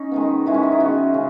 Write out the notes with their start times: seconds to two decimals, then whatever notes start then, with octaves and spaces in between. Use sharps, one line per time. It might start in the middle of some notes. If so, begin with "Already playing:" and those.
Already playing: C#4 D#4
0.12 D#3 G#3 B3
0.46 D#3 G#3 B3 E4
0.54 C#4
0.63 D#4
0.72 E4
0.80 D#3 G#3 B3 F#4
1.14 C#3 G#3